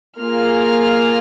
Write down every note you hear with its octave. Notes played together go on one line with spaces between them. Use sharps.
A#3 F4 G#4 F6